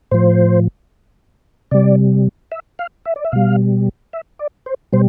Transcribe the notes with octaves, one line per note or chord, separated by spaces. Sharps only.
A2 F3 C5
C3 G3 D5
E5
F5
E5
D5
E5
B2 G3 F5
E5
D5
C5
B2 G3 C5